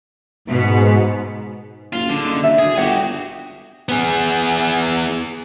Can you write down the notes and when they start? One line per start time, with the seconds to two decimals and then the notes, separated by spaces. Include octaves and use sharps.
0.48 G#2 B2 B3
1.93 F#1 F4
2.09 F#1 D3
2.25 D#4
2.43 E5
2.59 D2 G#4
2.78 G1 F#4 G4 G5
3.89 B3 G#4